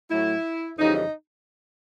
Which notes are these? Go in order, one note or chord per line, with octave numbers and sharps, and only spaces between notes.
A2 F#3 A3 E4
F2 C#3 E3 G3 D#4
D#4